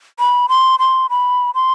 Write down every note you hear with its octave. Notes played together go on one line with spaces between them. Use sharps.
B5
C6
C6
B5
C6